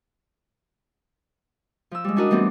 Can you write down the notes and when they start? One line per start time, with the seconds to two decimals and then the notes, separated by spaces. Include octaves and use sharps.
1.91 F3 E6
2.04 G3 G#3
2.16 C#4 D4 E4 F#4 A#4 D#5
2.31 E3 G3 A3 B3 C4